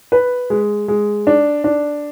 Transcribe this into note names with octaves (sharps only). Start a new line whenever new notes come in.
B4
G#3
G#3
D4
D4